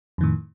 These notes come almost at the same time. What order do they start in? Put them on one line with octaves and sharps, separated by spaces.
F2 D#3 A2